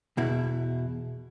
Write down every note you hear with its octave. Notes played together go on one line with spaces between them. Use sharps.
E2 B2 E4